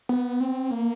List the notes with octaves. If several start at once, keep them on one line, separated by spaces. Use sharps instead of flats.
B3
C4
A#3